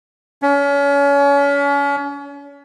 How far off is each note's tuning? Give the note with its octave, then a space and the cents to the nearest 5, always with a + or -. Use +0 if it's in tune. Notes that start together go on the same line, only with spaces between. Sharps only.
C#4 +35